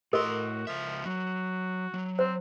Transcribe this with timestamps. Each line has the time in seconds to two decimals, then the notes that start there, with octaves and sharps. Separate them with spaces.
0.13 A2 F#4 A4 A#4 D#5 C6
0.67 C#2 F3 E5
1.06 F#3 F#4
1.94 F#3
2.19 C4 C5